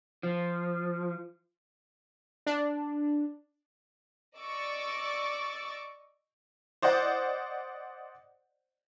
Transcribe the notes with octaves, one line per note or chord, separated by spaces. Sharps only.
F3
D4
D5 D#5 C#6 D6 E6 A6
C5 D5 D#5 F#5